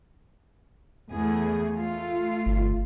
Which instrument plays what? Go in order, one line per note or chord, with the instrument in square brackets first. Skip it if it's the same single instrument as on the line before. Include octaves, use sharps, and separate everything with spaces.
[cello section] E2 A3 G#4
A3 F4
[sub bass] G1